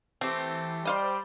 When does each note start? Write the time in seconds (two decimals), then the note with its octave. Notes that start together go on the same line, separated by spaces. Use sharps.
0.21 E3 A3 C4 G4
0.85 G3 C5 D5 D#5 F5 G5 C6